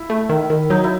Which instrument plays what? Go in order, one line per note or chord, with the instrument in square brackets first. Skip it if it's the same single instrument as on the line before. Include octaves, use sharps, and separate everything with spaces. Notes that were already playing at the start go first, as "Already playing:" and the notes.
Already playing: [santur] E4
[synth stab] A3
D#3
D#3
[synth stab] F#3 [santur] D#4
[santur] E4